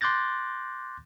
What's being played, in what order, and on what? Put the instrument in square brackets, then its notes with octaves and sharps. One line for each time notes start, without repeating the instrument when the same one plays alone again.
[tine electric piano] C6 D6 F#6 G6 A6 A#6